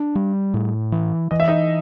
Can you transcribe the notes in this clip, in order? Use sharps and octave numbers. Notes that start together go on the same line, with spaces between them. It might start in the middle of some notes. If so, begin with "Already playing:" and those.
Already playing: D4
G3
A2
E3
E3 D#5
E5
D#4 D#5